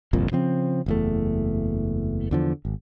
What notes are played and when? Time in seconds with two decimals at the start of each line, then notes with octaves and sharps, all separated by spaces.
0.13 G1 C2 F2 A#2
0.32 C#3 F3 C4
0.86 F#1 E2 A3
2.31 E2 D3 F3
2.65 G#1